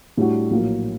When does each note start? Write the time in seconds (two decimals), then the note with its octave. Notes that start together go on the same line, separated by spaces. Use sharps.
0.17 A2 G3 D4 F#4
0.51 A#1 A2 F#3 A#3